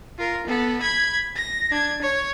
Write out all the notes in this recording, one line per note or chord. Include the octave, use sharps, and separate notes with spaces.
F4 A#4
B3 A4
B5 G#6
A#6
D4 G#6
C#5